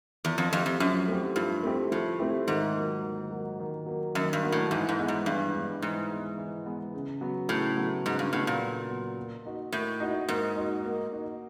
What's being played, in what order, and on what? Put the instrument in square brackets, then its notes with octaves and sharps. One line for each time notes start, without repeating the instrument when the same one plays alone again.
[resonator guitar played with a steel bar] E2 [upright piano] F3
[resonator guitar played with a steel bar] F2
[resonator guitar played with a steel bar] F2 [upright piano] A3 C4 E4 G4
[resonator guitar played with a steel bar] F2
[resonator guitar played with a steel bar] F#2 [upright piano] F3
[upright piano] A3 C4 E4 G4
[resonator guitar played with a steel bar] G2 [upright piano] F3
[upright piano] A3 C4 E4 G4
[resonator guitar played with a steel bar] A2 [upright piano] F3
[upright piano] A3 C4 E4 G4
[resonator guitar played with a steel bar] G#2 [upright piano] D#3
[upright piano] F#3 A#3
D#3
F#3 A#3
D#3
F#3 A#3
[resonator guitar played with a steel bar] F#2 [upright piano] D#3
[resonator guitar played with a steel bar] G2
[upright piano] F#3 A#3
[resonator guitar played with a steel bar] A2
[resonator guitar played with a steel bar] G#2 [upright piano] E3
[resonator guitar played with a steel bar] G#2
[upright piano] G#3 B3
[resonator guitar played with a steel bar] G#2
[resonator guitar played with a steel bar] G2 [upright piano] E3
[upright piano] G#3 B3
[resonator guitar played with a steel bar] G#2 [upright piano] E3
[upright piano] G#3 B3
E3
G#3 B3
C#3
F#3 B3
[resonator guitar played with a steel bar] A2 [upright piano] C#3
[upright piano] F#3 B3
[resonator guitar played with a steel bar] G#2 [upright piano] C#3
[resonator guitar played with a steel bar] G2
[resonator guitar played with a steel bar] A2 [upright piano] F#3 B3
[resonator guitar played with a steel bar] A#2
[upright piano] C#3
F#3 B3
A#3
D#4 F#4
[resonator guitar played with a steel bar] A2 [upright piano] A#3
[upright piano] D#4 F#4
[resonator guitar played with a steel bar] G#2 [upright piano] A#3
[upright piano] D#4 F#4
A#3
D#4 F#4